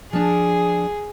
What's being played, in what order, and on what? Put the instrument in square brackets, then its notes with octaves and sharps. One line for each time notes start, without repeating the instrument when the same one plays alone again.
[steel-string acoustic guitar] F3 D4 [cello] G#4